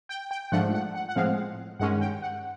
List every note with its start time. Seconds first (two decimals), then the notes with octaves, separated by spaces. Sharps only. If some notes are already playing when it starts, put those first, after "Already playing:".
0.09 G5
0.31 G5
0.52 G#2 F3 A3 D4 F#5
0.74 F#5
0.95 F#5
1.09 F#5
1.16 A2 F3 G#3 C4 F5
1.79 G2 D#3 G#3 C#4 F#5
2.01 G5
2.22 F#5